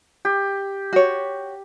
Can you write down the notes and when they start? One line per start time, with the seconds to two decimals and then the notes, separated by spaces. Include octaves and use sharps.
0.25 G4
0.93 F#4 C#5